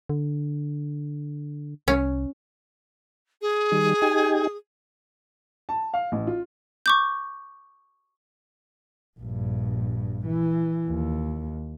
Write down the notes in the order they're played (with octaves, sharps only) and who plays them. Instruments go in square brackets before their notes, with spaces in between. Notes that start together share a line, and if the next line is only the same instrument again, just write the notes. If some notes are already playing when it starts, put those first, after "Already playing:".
[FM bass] D3
[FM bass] C2 [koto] C#4
[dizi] G#4
[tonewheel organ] D#3 G3
D#4 G4 G#5
[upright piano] A5
F5
A1
F4
[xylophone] C#6 D6 G6
[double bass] A#1 G2
E3
D#2